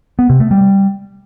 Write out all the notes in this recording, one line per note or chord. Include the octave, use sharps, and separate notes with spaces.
B3
C3
A3
G3